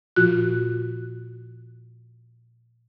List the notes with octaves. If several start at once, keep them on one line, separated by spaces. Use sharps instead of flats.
A#2 F3 F4 F#4 F#6